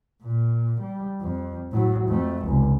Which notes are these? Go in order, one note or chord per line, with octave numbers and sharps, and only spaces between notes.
A#2
G3
F2
A2 F#3
F2 A3
F1 C#2